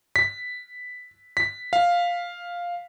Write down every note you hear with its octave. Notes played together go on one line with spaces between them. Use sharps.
B6
B6
F5